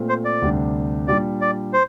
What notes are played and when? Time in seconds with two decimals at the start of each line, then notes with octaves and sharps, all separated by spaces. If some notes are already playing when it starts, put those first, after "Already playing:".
Already playing: A#2 A3 C4
0.09 C5
0.25 D5
0.42 D2 C3 G3 D4
1.08 A#2 G3 D4 D5
1.41 D5
1.73 C5